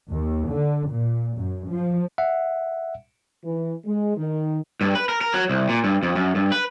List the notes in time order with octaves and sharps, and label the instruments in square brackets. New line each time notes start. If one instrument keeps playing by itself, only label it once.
[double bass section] D#2
D3
A#2
F#2
F3
[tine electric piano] E5 F#5
[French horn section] E3
G#3
D#3
[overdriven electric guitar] G2
B4
A#4
A#4
F#3
C2
A#2
G2
F2
F#2
G2
B4